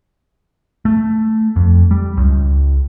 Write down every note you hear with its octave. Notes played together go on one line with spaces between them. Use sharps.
A3
F2
G3
C#2